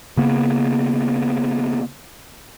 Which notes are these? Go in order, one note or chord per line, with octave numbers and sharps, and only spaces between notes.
C#3 A#3 B3